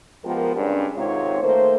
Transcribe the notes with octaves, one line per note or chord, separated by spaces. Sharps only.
F3 G#3 B3 G4 A#4
G2 C#3 G#3 C#4 D4
G#2 C3 D#3 C4 F4 C#5
D#3 A3 A#3 C5